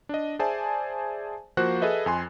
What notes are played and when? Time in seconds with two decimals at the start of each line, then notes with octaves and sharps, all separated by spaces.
0.09 D4 D#5
0.39 G#4 C5 D5 E5 G#5 A5
1.57 F3 A#3 F#4 C5 F#5 F#6
1.82 G#4 A4 B4 D#5 E5
2.06 F2 G#5 C6